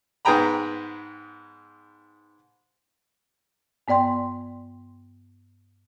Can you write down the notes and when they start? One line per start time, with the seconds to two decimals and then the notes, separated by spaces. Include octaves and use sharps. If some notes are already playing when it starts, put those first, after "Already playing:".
0.25 G#2 B3 G#4 G5 A#5 B5
3.88 G2 B3 D5 G5 C6